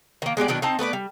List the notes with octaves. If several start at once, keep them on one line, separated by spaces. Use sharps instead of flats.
D#3 A#3
G#3 B3 G4 D5
B2 D#3 F#3 D4
C4 D#4 A5
A3 B3 B4 D5
G3